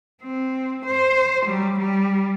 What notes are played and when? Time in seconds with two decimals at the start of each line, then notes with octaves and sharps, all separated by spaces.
0.23 C4
0.86 C5
1.45 F#3 G3
1.79 G3